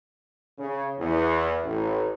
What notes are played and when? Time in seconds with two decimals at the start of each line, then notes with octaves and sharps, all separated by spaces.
0.58 C#3
0.97 E2
1.64 A1